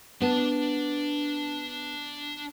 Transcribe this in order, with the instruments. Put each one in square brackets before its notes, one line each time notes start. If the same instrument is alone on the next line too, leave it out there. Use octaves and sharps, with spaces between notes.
[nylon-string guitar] B3 [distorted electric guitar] D4 A5